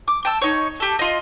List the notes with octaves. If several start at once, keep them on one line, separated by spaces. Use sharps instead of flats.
D6
G5 A5 E6
D#4 C#5
G4 A4
F4 D#5